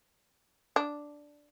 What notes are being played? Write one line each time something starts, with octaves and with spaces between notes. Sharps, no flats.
D4